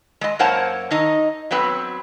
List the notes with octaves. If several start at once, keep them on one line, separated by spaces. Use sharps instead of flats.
G#3 D#5
F#2 A#3 C5 C#5 F#5 A5
D#3 D#4 D#5
F#3 B3 C4 B4